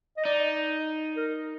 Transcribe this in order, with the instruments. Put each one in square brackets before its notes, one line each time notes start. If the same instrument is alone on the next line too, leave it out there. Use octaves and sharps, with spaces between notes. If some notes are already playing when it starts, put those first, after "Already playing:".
[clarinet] D#5
[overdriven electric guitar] D#4 [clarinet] D5
[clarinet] A#4